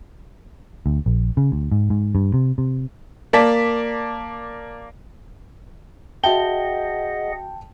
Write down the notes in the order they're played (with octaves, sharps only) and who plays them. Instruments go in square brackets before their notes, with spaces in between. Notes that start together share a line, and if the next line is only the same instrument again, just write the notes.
[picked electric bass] D2
A#1
C#3
D2
G#2
G#2
G2
C3
C3
[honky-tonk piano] A#3 D5 A5 B6
[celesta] F#4 E5 G7 [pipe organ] G#4 D#5 F#5 [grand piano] G5 A5